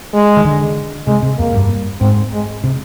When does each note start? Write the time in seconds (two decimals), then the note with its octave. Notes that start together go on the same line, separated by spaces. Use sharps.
0.14 G#3
0.37 D#3
0.45 D3
1.07 C3 G#3
1.23 C3
1.38 F2 A#3
1.54 G2
2.01 G#2 C4
2.32 G#3
2.64 C3